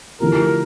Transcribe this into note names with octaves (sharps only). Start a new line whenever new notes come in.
D3 F3 A3 E4 G4 A#4